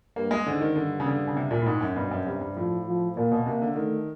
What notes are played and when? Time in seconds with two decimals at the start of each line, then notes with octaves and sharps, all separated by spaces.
0.16 G2 A#3
0.31 G#3
0.46 G#2 D3
0.61 D#3
0.76 G2 D3
1.00 C#3
1.06 D3
1.27 C#3
1.37 C3
1.51 A#2
1.62 A2
1.66 G#2
1.81 F#2
1.96 G2 B2
2.11 F#2
2.26 G2 C3
2.41 G2
2.57 A2 F3
2.87 F3
3.17 A#2 A#3
3.31 B2
3.46 C3 A#3
3.62 D3
3.76 D#3 A3